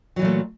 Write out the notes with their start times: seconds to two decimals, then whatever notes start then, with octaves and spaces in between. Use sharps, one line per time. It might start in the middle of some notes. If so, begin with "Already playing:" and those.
0.16 F#3
0.19 E3
0.22 A#2
0.25 A3